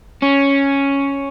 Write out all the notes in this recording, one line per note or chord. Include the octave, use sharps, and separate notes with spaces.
C#4